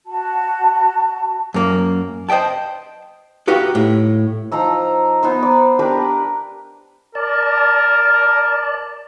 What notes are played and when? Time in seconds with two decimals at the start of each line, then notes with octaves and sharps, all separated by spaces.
0.06 F#4 A5
1.54 F#2 A#3
2.29 C5 D#5 E5 G5 A5
3.47 D#4 F#4 G4 B4 F5
3.75 A2
4.52 F3 D#4 A#5 E6
5.23 B3 D#4 C5
5.43 D5
5.79 D4 G4 A#4 B4
7.15 A#4 D5 A5